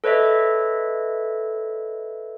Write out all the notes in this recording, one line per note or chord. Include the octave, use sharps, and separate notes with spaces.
A4 B4 C#5 D#5 E5